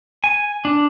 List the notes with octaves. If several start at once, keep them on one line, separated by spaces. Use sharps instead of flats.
G#5
D4